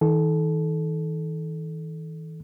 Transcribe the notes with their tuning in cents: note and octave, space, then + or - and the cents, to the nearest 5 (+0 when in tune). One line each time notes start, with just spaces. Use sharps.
D#3 +40 A4 -20